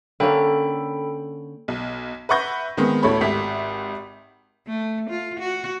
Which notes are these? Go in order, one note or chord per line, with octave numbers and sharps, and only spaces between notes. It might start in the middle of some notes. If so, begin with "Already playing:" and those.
D3 A#3 C#4 A4 G5 B5
B1
B4 E5 F#5 C#6 G6 A#6
D#3 G#3 B3 C4
D2 A2 A4 C#5 B5
G#1 G4 E5 B6
A3
F4
F#4